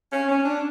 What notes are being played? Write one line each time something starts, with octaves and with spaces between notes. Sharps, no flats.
C#4
C#4
D4